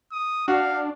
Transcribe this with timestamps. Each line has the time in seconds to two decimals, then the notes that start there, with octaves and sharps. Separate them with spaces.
0.12 D#6
0.48 D4 F#4 F5